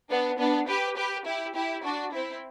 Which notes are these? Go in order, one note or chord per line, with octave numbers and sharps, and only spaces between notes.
B3 D4
B3 D4
G4 B4
G4 B4
E4 G4
E4 G4
D4 F#4
C4 E4